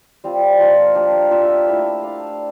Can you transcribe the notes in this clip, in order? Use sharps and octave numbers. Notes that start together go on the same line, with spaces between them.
G3 C4 F4
F3 A#3 F4
D4 G4 A#4 D5
C4 F4 A#4 E5
A3 E4 A#4 E5
D4 A4 D5 F5